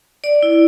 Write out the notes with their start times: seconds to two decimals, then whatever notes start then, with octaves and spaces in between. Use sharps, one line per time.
0.24 D5
0.43 E4